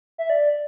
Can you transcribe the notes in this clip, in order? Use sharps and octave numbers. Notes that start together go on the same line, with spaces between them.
E5
D5